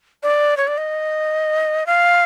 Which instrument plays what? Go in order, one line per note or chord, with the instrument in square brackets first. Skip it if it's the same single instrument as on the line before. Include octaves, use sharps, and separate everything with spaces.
[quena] D5
C#5
D5
D#5
F5